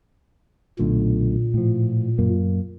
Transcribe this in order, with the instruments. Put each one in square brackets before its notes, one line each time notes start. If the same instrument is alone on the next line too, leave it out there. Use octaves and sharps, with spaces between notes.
[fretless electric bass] B1 D3 A3 [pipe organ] A#2
[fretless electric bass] A2 F3
F#2 A#3